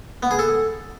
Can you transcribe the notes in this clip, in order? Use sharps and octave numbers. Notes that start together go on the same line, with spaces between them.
B3
G#4
A4